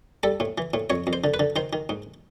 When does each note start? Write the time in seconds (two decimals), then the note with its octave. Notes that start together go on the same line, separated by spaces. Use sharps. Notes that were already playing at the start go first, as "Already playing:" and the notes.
0.23 G3 A4
0.40 A2
0.58 E3
0.74 A2
0.90 F2 C#5
1.07 F2
1.13 C5
1.24 D3
1.34 B4
1.39 D3
1.56 D#3 C5
1.73 D#3
1.89 G#2